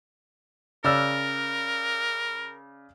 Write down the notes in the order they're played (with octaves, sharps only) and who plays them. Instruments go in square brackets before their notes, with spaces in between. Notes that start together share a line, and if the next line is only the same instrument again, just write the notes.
[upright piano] C#3 D5 E6 [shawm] A#4